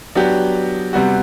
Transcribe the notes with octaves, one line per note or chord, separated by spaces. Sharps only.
F#3 B3 D4 G4
C3 G3 B3 F#4